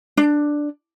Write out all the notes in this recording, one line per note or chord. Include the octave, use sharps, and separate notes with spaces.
D4